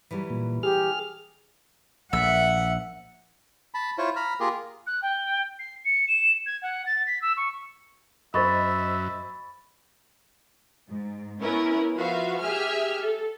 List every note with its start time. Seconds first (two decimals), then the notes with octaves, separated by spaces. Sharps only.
0.11 E3 F#3 G3
0.30 A#2
0.63 G4 G#4 F6
2.13 A#1 E5 F#5
3.74 A5 B5
3.98 E4 F4 C5 C#5
4.16 A#5 B5 F6
4.40 A#3 F4 G4 G#4 A#4
4.87 F#6
5.02 G5
5.59 C7
5.85 C#7
6.08 E7
6.46 G#6
6.62 F#5
6.86 A6
7.06 B6
7.21 E6
7.37 C#6
8.34 F#2 C5 D#5 E5 B5 C#6 A6
10.87 G#2
11.40 B3 C#4 E4 A#4 B4
11.96 F3 F#4 B4 E5 F5
12.40 G4 G#4 E5 G#5 F6
13.01 A4